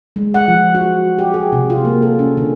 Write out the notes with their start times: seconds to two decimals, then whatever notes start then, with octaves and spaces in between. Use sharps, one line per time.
0.16 G#3
0.34 F#5
0.48 F3
0.75 F#4
1.18 G4
1.34 G#4
1.52 C3
1.70 F4
1.85 A#3
2.02 A4
2.19 C#4
2.37 D3